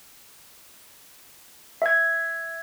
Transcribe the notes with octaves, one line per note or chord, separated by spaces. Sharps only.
E5 G#6